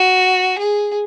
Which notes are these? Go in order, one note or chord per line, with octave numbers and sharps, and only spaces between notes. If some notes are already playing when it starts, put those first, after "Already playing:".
Already playing: F#4
G#4